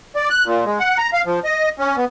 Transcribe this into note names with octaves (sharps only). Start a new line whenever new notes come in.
D5
F#6
A#2
G#3
F#5
A#5
F5
F3
D#5
C#4
B3